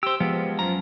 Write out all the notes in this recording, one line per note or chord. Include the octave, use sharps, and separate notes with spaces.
G4 C5 E6
F3 G#3 B3 G4
F#2 A#5